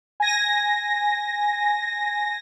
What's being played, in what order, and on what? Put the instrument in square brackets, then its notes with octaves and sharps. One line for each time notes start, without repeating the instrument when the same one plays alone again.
[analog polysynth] G#5 A#6